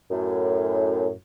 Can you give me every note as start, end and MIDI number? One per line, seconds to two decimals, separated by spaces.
0.11 1.11 42
0.11 1.11 45